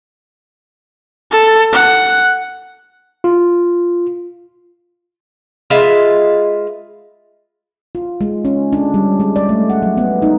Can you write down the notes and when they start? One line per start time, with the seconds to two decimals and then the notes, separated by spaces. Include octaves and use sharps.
1.31 A4
1.73 F#5
3.24 F4
5.70 G#3 F4 B4 E5
7.95 F4
8.21 G#3
8.45 C#4
8.73 D4
8.94 G3
9.20 G#3
9.36 D5
9.49 A3
9.70 F#5
9.82 F#3
9.97 B3
10.22 D#4